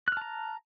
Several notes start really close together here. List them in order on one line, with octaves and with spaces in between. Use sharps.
F#6 F6 A5 A#5